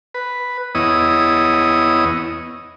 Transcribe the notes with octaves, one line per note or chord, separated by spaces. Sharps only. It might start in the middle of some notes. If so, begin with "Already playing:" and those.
B4
E2 B3 E4 C#5 D#5 D#6